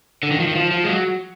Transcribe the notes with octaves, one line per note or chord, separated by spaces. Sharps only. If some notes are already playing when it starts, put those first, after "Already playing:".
D3
D#3
F3
D#3
F3
F3
G#3
F#3